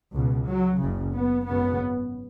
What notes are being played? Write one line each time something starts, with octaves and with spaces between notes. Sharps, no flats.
C#2 B2
F#3
F#1 F#2 C#3
B3
G#1 F#2 C#3 B3